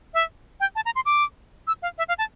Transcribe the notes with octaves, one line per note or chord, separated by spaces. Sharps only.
E5
G5
A5
A#5
C6
D6
E6
F5
E5
F5
A5